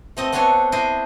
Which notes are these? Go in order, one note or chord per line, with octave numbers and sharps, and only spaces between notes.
A3 C4 D#5
B3 C4 D4 A4 C#5 G#5
D4 E4 C5 D#5 G#5